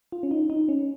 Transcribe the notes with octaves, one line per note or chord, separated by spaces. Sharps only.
F4
C#4
D#4
D#4
C#4